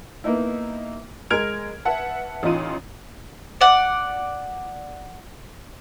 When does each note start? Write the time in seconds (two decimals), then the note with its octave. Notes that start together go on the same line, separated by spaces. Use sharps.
0.24 A#3 B3 D#4 E4
1.30 G#3 A#4 F6 G#6 D7 F7
1.85 B4 E5 F#5 A5
2.43 A1 D#4 F4 D#7
3.61 D5 F#5